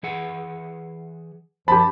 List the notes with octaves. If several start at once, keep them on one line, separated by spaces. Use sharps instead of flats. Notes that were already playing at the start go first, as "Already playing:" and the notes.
E3 G#4 F#5
F#2 F3 G4 A5 B5